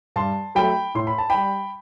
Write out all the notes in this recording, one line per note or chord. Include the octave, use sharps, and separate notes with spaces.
G2 A5 C6
F#3 A3 G5 B5
A2 C6
B5
A5
G3 G5 B5